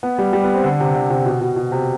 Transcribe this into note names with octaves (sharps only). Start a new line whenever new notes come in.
B3
G3
G3
B3
C4
D3
C3
D3
C3
B2
B2
B2
C3